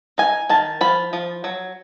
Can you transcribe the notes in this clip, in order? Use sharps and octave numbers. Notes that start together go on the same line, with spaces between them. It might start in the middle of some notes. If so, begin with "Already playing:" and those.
D#4 G#5
D#3 A5
F3 B5
F3
F#3